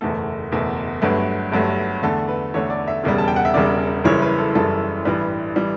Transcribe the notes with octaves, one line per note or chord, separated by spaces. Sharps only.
F#1 E2 B2 A3 A4
F#1 E2 B2 A3
G1 G2 F#3 A3 B4
G1 G2 F#3 A3
E2 D3 A3 A4
B4
E2 D3 A3 C#5
D5
E5
E1 E2 C#3 G3
A5
G5
F#5
E5
E1 E2 C#3 G3 D5
F#1 F#2 C#3 E3 G3 C#5
B4
A4
F#1 F#2 C#3 E3 G3 A4
A1 G2 E3 G3 B4
E3 G3